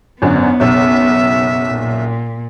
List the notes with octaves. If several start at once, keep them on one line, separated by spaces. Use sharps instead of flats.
G#1 F#2 D3 B3
F#1 B1 E5
A#2